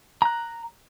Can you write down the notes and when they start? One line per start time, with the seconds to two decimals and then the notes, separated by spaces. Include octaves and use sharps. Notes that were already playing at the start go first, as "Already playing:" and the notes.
0.22 A#5 F#6